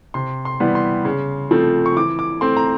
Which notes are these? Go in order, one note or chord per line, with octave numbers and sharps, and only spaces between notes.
C3 C6
C6
E3 G3 B3
C6
C#3
F3 A3 C4
C#6
E3 D6
D6
A3 C4 C6
A#5